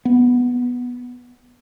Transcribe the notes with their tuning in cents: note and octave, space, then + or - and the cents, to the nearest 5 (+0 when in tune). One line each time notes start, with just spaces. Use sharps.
B3 -5